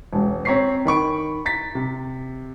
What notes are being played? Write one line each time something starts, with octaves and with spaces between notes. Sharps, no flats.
E1 C#2
C4 C#5 A#5 C#6 B6 C7
D#3 B5 C#6 D7
A#5 A6 B6
C3